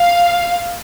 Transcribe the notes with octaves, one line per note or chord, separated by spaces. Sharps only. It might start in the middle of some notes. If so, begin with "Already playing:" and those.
Already playing: F5